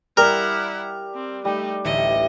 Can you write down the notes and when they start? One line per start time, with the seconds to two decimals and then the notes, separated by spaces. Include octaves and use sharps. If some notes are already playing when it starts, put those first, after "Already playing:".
0.17 G3 E4 A#4 F#5
1.15 C4
1.45 G3 A3 D#4
1.85 A1 D2 D#5 E5